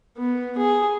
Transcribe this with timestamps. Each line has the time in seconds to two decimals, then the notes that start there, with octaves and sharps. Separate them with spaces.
0.18 B3
0.58 G#4